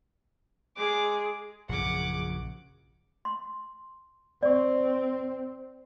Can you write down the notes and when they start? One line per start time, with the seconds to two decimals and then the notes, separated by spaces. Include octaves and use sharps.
0.77 G#3 G#4 D6
1.69 A#1 F#2 C#3 F#5 D6
3.25 C6
4.43 C4 D5 C#6